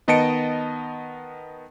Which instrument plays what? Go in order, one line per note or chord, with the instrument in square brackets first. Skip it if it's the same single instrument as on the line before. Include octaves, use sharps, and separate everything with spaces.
[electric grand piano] D#3 B3 D#5 A5 C#7 D7